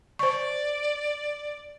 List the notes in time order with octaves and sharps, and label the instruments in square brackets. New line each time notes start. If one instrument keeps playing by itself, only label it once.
[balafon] C5 C#6 [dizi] D5